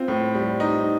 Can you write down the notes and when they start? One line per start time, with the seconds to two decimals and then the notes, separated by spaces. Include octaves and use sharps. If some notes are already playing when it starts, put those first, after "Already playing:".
Already playing: C4 F4
0.08 A2
0.34 G3
0.60 D#4